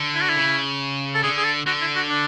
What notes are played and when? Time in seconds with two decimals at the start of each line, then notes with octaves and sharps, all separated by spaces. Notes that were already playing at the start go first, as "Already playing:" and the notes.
Already playing: D3
0.15 E4
0.22 F#4
0.30 E4
0.37 C#3
1.15 A4
1.23 D3 G#4
1.37 G#4
1.45 A4
1.66 D3 F#4
1.82 E4
1.96 F#4
2.09 D4